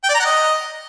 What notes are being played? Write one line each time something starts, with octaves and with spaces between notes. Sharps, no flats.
G5
D5
A#5
F#5
D#5